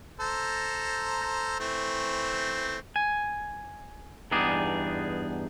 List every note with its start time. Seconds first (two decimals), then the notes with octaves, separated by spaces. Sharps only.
0.20 A4 C5 A#5
1.60 E3 A3 C4
2.96 G#5
4.31 E2 G2 B3 D#4 G#4 D5